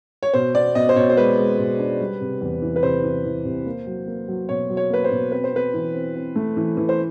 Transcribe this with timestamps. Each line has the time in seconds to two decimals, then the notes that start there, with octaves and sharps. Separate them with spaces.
0.23 C#5
0.34 B2 C5
0.55 B3 D5
0.75 B2 D#5
0.89 C5
0.96 B2 C#5
1.10 C5
1.17 G#3 B4
1.38 G#3
1.58 B2
1.79 D4
2.00 G3
2.21 C3
2.41 E2
2.62 E3
2.76 B4
2.83 C3 C5
3.03 E3
3.25 E3
3.45 C3
3.66 A#3
3.87 F#3
4.07 A#3
4.28 F#3
4.49 B2 C#5
4.70 F#3
4.77 C#5
4.90 A#3 B4
5.04 C5
5.11 B2
5.32 C4 B4
5.44 C5
5.53 C4 B4
5.74 E3
5.94 C4
6.16 C4
6.36 A3
6.57 E3
6.77 E3
6.89 C5